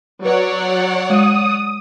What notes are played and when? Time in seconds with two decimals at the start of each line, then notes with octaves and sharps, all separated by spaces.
0.25 F#3 B4 C#5 D5 F#5
1.10 G#3 D#6